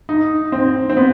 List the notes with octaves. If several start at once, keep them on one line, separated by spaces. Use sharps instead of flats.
D#4
C4
C4
B3